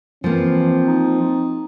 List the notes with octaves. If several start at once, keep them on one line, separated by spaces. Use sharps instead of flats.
E3 F3 A#3 C4
D#4